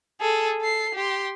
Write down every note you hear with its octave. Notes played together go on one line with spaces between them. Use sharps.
G#4 A4
A4 C7
G4 C6